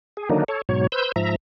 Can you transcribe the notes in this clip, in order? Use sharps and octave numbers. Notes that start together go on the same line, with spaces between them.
G#4
D3 D#3 F#3 A#3 D4 D#4
A4 C#5
G#2 B2 F#3 C#5
B4 C5 E6 G6
G#2 F3 E5 A#5